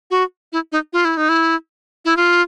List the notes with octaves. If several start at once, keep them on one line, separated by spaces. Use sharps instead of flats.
F#4
E4
D#4
F4
E4
D#4
E4
E4
F4